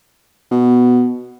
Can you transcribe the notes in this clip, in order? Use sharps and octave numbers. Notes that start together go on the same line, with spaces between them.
B2